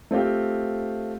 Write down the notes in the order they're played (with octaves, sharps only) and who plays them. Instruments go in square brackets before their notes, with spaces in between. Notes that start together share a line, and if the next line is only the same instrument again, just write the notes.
[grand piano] A3 C4 F4 G4